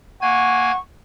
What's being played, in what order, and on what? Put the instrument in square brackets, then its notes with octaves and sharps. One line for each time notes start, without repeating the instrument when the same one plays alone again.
[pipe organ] A#3 G#5 G#6 [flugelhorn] F#5 [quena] C#6